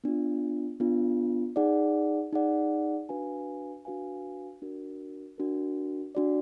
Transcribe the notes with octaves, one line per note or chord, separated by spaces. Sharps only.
B3 D4 F4
B3 D4 F4
D#4 G#4 D5 F#5
D#4 G#4 D5 F#5
D4 F#4 B4 F5 G#5
D4 F#4 B4 F5 G#5
D4 F#4 A#4
D4 F#4 A#4
D4 F#4 D5